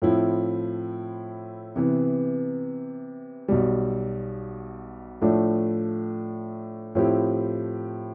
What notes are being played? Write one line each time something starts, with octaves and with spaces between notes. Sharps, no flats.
A2 F3 C4 E4
C3 E3 B3
B1 B2 G3
A2 F3 A3 D4
A2 F3 C4 E4 G4